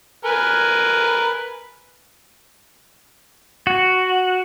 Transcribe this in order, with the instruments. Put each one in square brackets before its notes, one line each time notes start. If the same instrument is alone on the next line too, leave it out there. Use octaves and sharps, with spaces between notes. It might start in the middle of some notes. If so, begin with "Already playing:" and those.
[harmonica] A#4 B4 G#5
[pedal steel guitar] F#4